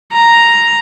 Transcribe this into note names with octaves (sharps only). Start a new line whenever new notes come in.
A#5